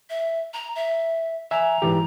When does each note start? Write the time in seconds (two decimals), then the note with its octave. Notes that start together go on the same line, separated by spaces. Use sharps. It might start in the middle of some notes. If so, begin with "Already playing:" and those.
0.10 E5
0.54 A#5
0.76 E5
1.51 E5 G#5 A#5
1.82 G#2 E3 G4